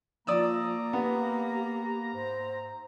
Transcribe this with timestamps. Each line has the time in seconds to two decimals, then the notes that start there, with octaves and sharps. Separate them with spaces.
0.27 F3 A#3 D5 A#5 D#6 E6
0.93 B3 G4
2.14 G#2 C5